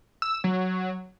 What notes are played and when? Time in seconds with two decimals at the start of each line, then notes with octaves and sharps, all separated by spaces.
0.22 E6
0.44 F#3